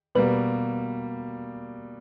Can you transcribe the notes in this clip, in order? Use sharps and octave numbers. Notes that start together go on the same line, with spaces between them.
B2 G3 A#3 B4